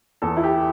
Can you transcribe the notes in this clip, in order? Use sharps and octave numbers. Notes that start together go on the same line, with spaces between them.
E2 A4
E4
G4